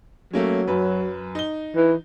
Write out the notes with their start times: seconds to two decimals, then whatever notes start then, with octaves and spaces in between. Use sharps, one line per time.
0.33 F#3 A3 A#3 C#4
0.67 F#2 B4
1.35 D#4 G7
1.76 E3